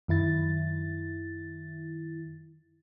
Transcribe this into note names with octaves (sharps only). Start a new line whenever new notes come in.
F#2 D#3 E4 A6